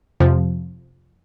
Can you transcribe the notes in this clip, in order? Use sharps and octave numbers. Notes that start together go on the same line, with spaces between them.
F2 C3 F3